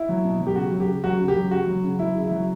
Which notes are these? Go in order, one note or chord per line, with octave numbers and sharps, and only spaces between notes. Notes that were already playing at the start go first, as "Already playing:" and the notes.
Already playing: E4
F#3
B2
F#3
G4
C#3 F#4
F#3
G4
C#3
F#3 F#4
C#3
G4
F#3
C#3 F#4
F#3
C#3
F#3 E4
C#3
E4
F#3